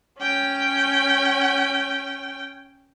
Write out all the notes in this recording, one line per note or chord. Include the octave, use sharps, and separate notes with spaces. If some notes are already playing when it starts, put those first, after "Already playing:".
C#4 G5